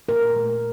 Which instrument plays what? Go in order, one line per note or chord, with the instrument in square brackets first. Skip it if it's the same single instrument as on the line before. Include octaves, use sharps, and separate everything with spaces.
[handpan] A#2 A#4
A3